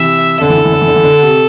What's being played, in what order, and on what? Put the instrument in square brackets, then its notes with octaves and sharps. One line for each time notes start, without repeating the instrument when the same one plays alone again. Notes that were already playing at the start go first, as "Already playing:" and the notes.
Already playing: [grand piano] C3 E3 [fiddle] E5
[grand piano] D3 [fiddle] A4
[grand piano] E3
D3
E3
D3
E3
D3
E3
D3
C3